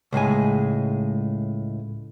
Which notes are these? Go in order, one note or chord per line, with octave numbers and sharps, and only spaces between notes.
C#2 A2 G#3 G#5